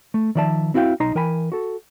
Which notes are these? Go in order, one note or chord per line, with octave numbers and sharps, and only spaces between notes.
A3
D#3 F3 D5 E5 A5
C4 E4 F#4 F5 G5
B1 D#4 A#5 C6
E3 A#4 G5 G#5 B5
F#4 A4